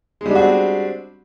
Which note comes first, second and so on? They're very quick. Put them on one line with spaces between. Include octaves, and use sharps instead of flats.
G#3 G3 D4 F#4 C4